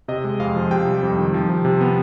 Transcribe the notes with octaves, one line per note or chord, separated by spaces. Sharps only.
C3 D#5
G#3
F2 F5
F3
C3 G5
G3
F2
D#3
F3
C3
C3
B3